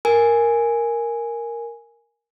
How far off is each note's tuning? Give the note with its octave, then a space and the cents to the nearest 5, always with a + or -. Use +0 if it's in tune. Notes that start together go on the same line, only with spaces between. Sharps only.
A#4 +0 G#5 +0